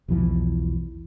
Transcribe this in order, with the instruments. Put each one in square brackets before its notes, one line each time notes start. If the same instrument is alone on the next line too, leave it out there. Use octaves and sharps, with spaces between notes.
[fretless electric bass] B1 E2 E3 F3